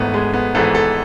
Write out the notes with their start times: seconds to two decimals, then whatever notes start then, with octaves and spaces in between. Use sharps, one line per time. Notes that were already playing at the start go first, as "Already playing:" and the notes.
Already playing: G#1 G#2 E3 A3 B3
0.14 G#3
0.34 B3
0.55 G#1 G#2 E3 A4
0.75 A4